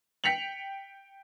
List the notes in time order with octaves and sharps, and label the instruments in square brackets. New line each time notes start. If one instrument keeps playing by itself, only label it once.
[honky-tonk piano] G5 B6 C#7 F7 F#7